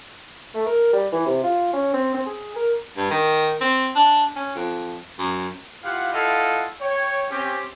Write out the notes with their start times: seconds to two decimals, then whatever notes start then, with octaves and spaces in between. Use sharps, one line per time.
0.54 A3
0.66 A#4
0.93 G3
1.12 E3
1.26 C3
1.44 F4
1.73 C#4
1.94 C4
2.14 C4
2.26 G#4
2.56 A#4
2.97 G2
3.11 D#3
3.61 C4
3.95 D4
4.36 C#4
4.56 F2
5.19 F#2
5.83 E4 F4 G4 F5 F#5
6.13 E4 F4 A4 D#5 F5 F#5
6.81 C#5 G5
7.30 C4 C#4 G4